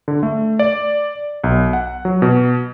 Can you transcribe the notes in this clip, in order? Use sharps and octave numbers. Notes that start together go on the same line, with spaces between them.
D3
A3
D5
B1
F#5
F#3
B2